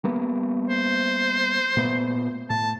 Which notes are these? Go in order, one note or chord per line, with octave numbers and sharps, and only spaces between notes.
G3 A#3 B3
C5
A#2 A3 B3
A2 A5